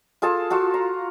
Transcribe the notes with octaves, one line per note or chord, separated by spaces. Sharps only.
F4 G#4 A4 A5
F4 F#4 A4
A#5